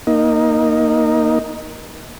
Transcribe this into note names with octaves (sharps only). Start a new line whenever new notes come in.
A#3 D#4